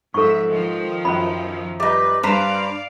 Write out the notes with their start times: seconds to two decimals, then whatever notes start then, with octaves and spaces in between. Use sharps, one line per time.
0.14 G#2 F3 A4 E5 C#6
0.49 D#3 F3
1.05 F#2 C#4 B5
1.80 G3 D#4 B4
2.23 G2 B4 C5 D5 F5 A#5 B6 E7